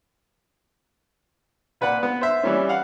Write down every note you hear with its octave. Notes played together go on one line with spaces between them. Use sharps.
A#2 B4 D5 F#5 F#6
B3
C5 E5
E3 G3 C#4
F5 F#5